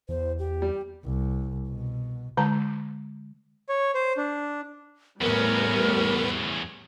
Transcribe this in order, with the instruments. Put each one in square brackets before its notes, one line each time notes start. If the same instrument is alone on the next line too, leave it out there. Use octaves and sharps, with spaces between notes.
[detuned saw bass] E2 [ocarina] C5
[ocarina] G4
[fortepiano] G3
[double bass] C2
B2
[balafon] D3 G#3 A5 A#5
[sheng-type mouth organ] C#5
C5
D4
[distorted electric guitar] E2 C#4 [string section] A2 G3 [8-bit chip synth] B3 B4 [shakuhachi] A#4